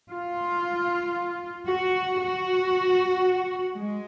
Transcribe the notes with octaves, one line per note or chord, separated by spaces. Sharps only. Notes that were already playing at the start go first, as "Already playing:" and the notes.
F4
F#4
F#4
G#3